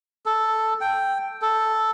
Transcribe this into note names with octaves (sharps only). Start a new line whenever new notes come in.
A4
G5
A4